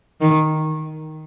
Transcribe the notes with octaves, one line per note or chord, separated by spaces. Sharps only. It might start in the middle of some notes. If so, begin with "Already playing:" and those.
D#3